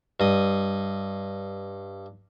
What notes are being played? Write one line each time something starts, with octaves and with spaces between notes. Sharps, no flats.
G2 D#5